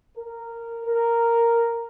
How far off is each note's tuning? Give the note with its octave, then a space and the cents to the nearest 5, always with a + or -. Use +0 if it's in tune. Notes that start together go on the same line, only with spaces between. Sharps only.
A#4 -10
A#4 -5